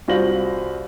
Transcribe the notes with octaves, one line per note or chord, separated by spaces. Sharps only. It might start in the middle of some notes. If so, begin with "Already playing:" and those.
C2 F4 F#4 C5 A#6 F#7